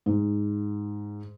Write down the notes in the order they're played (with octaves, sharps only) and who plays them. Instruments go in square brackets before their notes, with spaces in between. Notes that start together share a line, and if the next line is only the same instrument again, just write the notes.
[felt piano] G#2